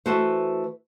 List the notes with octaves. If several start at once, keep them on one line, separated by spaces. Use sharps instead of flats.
E3 A3 F#4 A4 B4 C5